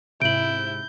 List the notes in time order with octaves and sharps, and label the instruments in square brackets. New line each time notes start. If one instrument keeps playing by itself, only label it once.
[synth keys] G#2 C3 [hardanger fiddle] E4 [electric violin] G6 [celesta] D7 F#7